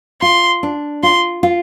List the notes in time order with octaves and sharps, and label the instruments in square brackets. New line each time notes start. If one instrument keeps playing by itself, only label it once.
[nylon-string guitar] F4 [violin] C6
[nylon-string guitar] D4
[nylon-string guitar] F4 [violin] C6
[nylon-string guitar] F4